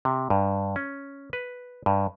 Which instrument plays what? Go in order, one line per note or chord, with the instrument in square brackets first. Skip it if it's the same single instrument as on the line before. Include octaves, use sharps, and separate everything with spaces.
[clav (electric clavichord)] C3
G2
C#4
B4
G2